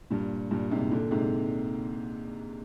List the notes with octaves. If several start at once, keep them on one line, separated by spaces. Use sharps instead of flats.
G2 A#2
G2 A#2
G#2 C3
A#2 D3
G#2 C3